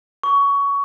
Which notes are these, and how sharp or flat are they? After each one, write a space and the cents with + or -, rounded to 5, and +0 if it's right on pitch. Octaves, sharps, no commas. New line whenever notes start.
C#6 +20